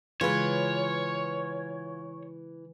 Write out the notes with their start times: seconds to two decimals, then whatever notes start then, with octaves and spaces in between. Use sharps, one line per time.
0.21 C#3 E3 G#3 F4 G#4 B4 C#5